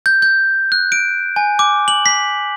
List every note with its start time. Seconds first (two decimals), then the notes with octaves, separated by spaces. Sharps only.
0.06 G6
0.22 G6
0.72 F#6
0.92 D7
1.36 G#5
1.59 D6
1.88 F#7
2.06 B6